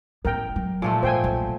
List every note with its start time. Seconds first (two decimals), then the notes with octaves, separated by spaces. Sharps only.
0.25 A1 B3 A#4 G5
0.56 F#3
0.82 A#2 F3 A3
1.03 G#2 C5 G5 G#5
1.24 B1